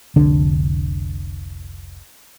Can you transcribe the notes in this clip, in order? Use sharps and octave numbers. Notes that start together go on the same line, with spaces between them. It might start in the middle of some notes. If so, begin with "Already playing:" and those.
F1 C2 D3 D4